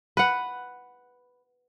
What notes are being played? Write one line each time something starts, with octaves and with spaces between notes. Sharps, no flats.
B4 F#5